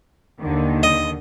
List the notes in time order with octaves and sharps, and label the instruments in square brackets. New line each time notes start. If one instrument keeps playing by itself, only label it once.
[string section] D#2 D3 D#3
[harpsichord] D#5